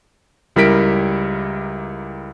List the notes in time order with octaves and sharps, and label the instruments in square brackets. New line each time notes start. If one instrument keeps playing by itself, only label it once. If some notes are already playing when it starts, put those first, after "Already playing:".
[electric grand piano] C#2 G3 E4 A#4 B6 D7